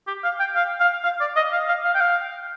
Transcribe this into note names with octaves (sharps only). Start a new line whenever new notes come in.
G4
F5
G5
F5
F5
F5
D5
D#5
F5
F5
F5
G5
F5